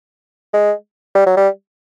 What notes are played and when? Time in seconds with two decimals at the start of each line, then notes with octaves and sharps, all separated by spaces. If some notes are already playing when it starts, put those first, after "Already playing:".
0.53 G#3
1.15 G3
1.26 F#3
1.37 G3